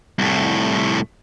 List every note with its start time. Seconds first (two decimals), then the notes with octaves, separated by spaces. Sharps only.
0.19 C2 A2